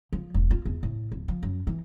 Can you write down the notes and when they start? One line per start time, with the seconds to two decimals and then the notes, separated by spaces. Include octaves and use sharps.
0.13 F3
0.34 E1
0.51 F4
0.65 E2
0.83 A2
1.12 D1
1.28 F3
1.43 F#2
1.67 E3